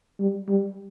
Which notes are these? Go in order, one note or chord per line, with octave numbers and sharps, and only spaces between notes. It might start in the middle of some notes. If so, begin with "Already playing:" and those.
G3
G3